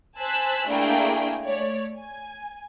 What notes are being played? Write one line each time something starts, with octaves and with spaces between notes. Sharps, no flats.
C5 G#5 A5 E6 F#6 B6
A3 A#3 D4 E4 G#4 G5
A3 C#5 D5
G#5